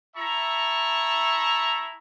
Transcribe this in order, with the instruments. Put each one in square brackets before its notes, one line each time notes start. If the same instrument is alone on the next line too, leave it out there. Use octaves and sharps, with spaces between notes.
[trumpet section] E4 E5 A5 A#5 C#6